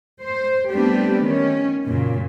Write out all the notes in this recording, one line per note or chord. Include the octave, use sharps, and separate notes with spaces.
C5
G3 A3 B3 C4 D4 G4
D#3 C#4
F#2 A#2 C#3